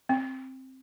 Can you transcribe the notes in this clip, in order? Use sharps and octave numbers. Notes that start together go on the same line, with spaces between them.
C4